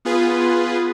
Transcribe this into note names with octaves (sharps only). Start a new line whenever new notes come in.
B3 F4 G#4 B4